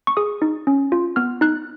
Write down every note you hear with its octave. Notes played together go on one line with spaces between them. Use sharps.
C#6
G#4 D#6
D#4
C#4
F4
B3 F6
D#4 F#6